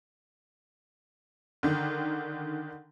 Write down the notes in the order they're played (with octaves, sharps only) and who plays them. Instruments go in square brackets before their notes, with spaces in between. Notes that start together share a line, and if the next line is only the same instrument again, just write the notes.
[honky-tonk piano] D3 D#3